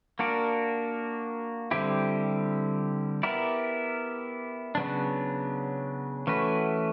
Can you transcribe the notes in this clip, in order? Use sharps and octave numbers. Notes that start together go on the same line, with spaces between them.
A#3 D4 F#4 A#4 D5
D3 G3 C4 E4 G4
B3 E4 G4 A#4 D5
C#3 F#3 B3 D4
E3 A3 C#4 F#4 B4